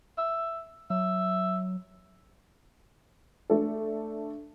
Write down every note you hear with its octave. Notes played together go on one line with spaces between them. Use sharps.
E5
F#3 E5
A3 D4 A4